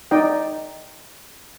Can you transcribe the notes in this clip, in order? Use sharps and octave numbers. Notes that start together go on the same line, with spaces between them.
D#4 D5 D#5 G5